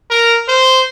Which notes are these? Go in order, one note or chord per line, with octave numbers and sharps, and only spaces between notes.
A#4
C5